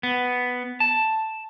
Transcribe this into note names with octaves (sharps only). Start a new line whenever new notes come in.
B3
A5